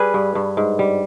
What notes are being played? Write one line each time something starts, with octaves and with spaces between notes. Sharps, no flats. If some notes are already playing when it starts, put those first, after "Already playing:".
Already playing: G3 G#4 B4
G2
G2
G#2
G3